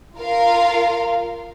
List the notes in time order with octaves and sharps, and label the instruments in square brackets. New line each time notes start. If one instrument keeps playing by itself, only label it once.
[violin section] F4 A#4 F5